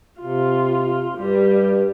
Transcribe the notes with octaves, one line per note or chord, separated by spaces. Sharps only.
C3 F4
G2 G3